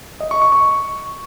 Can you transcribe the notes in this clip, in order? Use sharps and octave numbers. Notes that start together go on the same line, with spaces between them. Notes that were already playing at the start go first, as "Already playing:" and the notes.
D#5
C#6
C#6
C#6